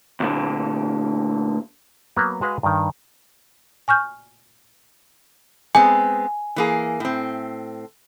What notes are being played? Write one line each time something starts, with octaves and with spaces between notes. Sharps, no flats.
D2 A#2 D3
F#3 A#3 B3
G#3 F#4 G#4 B4 F5
G2 D#3
G#5 C#6 F6 G6
G#3 B3 C4 G#5
E3 A#3 G#4
A2 C4